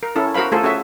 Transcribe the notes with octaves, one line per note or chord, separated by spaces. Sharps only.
A#4
C#4 E4 A4
F#4 A#4 C5 F5 B5
A3 F4 G#4 A4 C5
C#4 F#4 G#4 E5